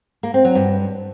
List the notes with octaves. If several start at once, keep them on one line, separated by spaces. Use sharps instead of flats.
A#3
C4
F#3
G2